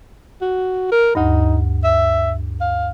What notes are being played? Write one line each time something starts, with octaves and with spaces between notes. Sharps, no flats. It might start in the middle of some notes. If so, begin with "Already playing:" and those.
F#4
A#4
D2 G2 D#4
E5
F5